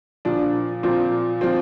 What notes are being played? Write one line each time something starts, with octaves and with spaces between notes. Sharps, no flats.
A#2 F3 D4
A#2 F3 C4
A#2 F3 C4